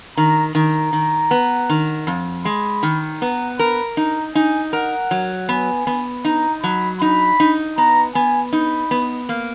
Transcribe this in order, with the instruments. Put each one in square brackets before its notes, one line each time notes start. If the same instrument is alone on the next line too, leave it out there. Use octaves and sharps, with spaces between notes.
[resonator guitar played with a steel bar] D#3 [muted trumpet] A#5
[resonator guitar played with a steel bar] D#3 [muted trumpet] A#5
[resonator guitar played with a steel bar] D#3
B3
D#3
F2
[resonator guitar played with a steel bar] G#3 [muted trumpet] B5
[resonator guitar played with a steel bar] D#3
[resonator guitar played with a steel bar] B3 [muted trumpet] A#5
[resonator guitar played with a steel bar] A#4 [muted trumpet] B5
[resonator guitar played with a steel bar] D#4 [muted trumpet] A#5
[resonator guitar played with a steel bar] D#4 [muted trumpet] G#5
[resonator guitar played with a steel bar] A#4 [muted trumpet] F#5
[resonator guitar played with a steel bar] F#3
[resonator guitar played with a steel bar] B3 [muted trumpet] G#5
[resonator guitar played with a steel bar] B3
[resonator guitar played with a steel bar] D#4 [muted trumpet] A#5
[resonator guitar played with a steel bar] F#3 [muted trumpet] B5
[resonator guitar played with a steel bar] D#4 [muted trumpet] B5
[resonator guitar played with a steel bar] D#4
[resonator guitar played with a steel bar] B3 [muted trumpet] A#5
[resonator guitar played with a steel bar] B3 [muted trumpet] G#5
[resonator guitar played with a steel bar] D#4 [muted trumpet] B5
[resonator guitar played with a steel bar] B3
A#3